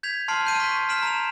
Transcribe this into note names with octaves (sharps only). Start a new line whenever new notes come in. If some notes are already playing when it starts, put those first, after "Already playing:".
G6 G#6 B6 F7
A5 C6 F6 C7 D7
F6 G6 C7 D#7
A5 C6 C#6 B6
F6 B6 D7 E7 F#7
A#5 F7